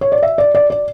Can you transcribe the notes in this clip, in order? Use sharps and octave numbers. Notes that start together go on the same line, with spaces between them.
C#5
D5
E5
D5
D5
D5